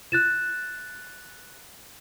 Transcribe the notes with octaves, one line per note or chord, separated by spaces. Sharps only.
F#6 A6 E7